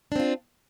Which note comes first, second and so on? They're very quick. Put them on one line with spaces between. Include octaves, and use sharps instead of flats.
D4 C4 F4